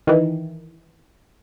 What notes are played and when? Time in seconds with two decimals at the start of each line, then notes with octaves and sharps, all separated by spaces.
0.07 D#3 E3